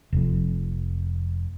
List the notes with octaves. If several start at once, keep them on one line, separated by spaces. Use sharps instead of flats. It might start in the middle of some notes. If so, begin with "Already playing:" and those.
F1 F2